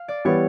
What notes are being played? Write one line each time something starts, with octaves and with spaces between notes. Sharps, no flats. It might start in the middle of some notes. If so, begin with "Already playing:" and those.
Already playing: F5
D5
E3 G3 B3 C#5